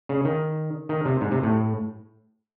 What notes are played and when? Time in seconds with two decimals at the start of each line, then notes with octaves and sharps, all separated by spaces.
0.09 C#3
0.25 D#3
0.89 D#3
1.05 C3
1.21 G#2
1.31 C3
1.43 A2